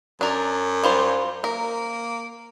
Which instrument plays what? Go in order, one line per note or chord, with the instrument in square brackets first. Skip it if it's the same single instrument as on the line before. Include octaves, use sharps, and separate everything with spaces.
[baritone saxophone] F#2 [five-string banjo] D4 A#4
[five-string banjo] G3 F4 C5
[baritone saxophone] A#3 [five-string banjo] A#4